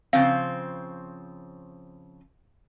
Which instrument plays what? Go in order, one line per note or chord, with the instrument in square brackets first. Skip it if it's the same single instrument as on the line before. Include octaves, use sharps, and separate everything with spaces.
[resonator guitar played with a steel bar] C#3 F3 C4 [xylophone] F5